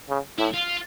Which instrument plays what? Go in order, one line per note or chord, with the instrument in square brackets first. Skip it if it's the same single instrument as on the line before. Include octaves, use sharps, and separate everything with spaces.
[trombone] C#3
[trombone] A2 [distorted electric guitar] E4
[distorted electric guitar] F4